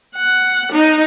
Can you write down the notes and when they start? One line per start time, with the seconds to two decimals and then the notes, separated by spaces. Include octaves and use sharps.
0.17 F#5
0.72 D#4